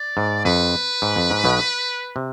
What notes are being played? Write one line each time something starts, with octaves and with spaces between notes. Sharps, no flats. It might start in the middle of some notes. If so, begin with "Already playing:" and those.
Already playing: D5
G#2
F2 B4
G#2
F2
G#2
B1 B2
C3